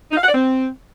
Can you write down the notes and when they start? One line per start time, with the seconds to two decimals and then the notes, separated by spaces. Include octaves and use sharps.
0.11 D#4
0.17 F5
0.23 F#5
0.28 D5
0.34 C4